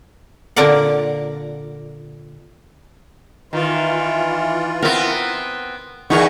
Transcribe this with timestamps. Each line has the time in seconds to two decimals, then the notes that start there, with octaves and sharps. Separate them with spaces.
0.56 A#2 D3 A#4 D5 F5 F#5
3.53 D#3 E3 F4
4.82 B3 C4 A#4 B4
6.10 E2 B3 D#4 G#4 A#4 C#6